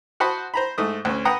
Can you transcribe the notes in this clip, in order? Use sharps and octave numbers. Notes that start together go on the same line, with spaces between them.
F#4 C5 F#5 A5 B5 D#6
C5 A#5 B5
G#2 A3 D#6
D2 C#4
B4 F#5 G5 A#5 D#6